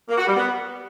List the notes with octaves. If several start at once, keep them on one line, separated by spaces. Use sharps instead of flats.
A#3
F#4
G3
B3